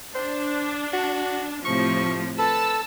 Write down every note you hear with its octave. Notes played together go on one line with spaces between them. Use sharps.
D4 C5
F#4
A2 C3 F3 C#6
A4 B4 A5 E6